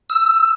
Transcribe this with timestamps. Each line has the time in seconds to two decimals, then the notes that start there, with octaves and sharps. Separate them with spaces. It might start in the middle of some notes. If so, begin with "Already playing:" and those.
0.10 E6